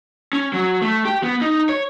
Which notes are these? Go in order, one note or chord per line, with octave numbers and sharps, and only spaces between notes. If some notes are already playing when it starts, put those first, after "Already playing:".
C#4
F#3
A3
G4
B3
D#4
C#5